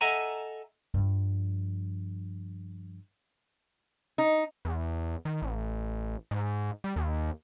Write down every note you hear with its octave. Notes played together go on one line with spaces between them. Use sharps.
A4 D#5 E5 F#5 G#5 A#5
G2 F3
D#4
E2
D#3
A1
G#2
G3
D#2